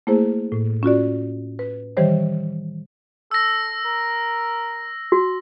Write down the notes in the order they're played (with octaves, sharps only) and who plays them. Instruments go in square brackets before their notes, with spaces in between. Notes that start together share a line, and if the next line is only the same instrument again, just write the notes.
[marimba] A3 A#3 E4 G#4 C5
A2
C#4 F4 F#4 D5
B4
D#3 E3 G3 G4 C5 C#5
[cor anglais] A4 [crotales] E6 A#6
[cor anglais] A#4
[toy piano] F#4